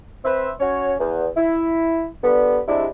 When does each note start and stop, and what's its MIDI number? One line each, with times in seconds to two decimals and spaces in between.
0.25 0.50 60
0.25 0.50 71
0.25 0.50 72
0.25 0.50 76
0.60 0.95 61
0.60 0.95 66
0.60 0.95 73
1.00 1.27 40
1.37 2.07 64
2.23 2.60 50
2.23 2.60 55
2.23 2.60 59
2.68 2.87 48
2.68 2.87 55
2.68 2.87 56
2.68 2.87 62
2.68 2.87 64